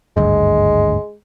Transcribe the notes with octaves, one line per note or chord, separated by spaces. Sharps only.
G#1 D2 G2 G#3